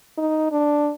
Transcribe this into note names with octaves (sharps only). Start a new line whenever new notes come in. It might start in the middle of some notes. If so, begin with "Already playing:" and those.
D#4
D4